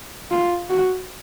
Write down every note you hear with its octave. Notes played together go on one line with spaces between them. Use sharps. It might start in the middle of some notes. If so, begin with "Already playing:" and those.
F4
F#4